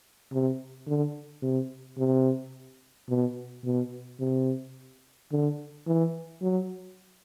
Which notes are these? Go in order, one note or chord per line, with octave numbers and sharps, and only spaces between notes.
C3
D3
C3
C3
B2
B2
C3
D3
E3
F#3